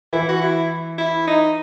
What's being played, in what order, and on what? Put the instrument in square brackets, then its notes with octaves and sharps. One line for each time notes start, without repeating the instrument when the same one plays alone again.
[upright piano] E3 [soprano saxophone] E4
[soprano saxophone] F#4
E4
E4
D#4